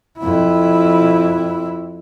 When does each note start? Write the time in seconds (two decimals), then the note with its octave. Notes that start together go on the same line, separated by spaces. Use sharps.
0.19 F2 E4